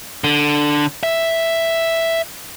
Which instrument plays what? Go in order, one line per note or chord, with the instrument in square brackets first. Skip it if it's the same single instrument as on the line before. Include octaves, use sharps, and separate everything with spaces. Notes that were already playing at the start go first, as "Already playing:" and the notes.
[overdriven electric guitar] D3
E5